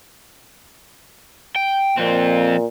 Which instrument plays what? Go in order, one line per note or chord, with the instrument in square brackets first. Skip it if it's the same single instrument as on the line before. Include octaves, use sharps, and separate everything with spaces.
[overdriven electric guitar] G5
[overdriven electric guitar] F2 C4 [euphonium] A#2